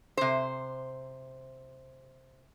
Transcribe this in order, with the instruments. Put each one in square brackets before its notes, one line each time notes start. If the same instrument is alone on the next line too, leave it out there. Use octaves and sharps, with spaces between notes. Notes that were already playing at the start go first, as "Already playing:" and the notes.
[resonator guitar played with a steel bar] C3 C5